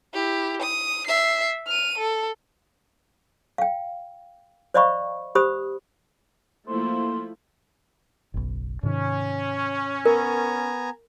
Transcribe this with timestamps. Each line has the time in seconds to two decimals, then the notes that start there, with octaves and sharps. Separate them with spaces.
0.14 E4 G4
0.62 D#6
1.07 E5 C7
1.67 F6 D#7
1.98 A4
3.58 F5 G5
4.74 C5 D5 D#5 F5 B5 C#6
5.35 G4 C5 B5 D#6
6.68 F3 A3 A#3 E4 C5
8.34 F#1 B1
8.83 G#2 C3 D#3 C#4
10.06 B3 A#4 G#5 A#5